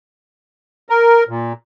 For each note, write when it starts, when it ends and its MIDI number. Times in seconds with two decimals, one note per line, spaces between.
0.90 1.24 70
1.29 1.53 46